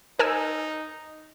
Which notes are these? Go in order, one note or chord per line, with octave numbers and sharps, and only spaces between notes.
D#4 A#4 G#5 E6